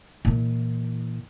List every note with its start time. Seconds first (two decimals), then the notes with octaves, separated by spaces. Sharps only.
0.25 A#2 E3